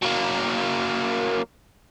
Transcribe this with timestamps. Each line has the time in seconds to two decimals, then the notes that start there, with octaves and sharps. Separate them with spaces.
0.02 F#3 A#3